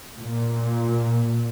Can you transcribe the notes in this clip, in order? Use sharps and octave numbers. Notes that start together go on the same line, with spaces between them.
A#2